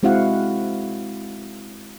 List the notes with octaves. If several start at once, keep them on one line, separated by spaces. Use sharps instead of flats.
G#3 C4 E4 F#4 F5 F#5